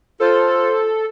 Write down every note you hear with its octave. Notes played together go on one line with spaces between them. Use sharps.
F4 A4 C5